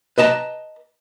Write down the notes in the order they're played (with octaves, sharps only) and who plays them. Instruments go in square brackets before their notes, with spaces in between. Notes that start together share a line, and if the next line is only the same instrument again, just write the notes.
[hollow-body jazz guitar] B4 D#5 A5 A#5